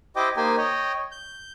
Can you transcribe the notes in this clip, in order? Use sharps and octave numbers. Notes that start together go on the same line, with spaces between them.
E4 G4 C5 D#5 G5 D6
A#3 D#4 G4 C5 G5 G#5
C#5 D#5 G5
G6